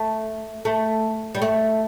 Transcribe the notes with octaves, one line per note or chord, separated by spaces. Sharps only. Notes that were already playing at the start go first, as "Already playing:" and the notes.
Already playing: A3
A3
G3
A3